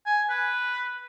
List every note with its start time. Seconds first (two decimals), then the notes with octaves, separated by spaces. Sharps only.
0.06 G#5
0.29 B4